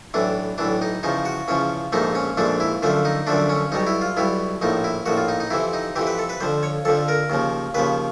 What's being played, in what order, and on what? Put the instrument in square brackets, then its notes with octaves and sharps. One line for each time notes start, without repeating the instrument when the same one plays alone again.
[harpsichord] B1 A2 E3 D4
B1 A2 E3 D4
D#4
E2 C#3 F3 D#4
F#4
E2 C#3 F3 C#4
A#1 G#2 F3 A3 D#4
C#4
A#1 G#2 F3 A3 D4
E4
F#2 D3 F3 A3 F4
D#4
F#2 D3 F3 A3 D4
C#4
B1 B2 G3 D#4
E4
F4
B1 B2 G3 E4
A#1 A2 F3 D#4
E4
A#1 A2 F3 F#4
F4
D#4
D#4
F2 C3 E3 E4
D#4
F2 C3 E3 G4
B4
A4
B4
F2 D3 F3 C5
C#5
F2 D3 F3 A4
A#4
D#2 C#3 F3
D#2 C#3 F3 B4